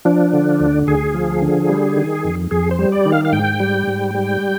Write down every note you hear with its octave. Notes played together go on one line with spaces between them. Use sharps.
F3 D4
D3
D2
D2 G#4
F3
D3
G3
D#3
F2
F2 G#4
C5
G3
D5
D#3
F5
F5
G#2 G5
G3
G#2
G3